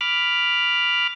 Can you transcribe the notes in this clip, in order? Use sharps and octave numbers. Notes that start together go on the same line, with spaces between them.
B5 D6 F6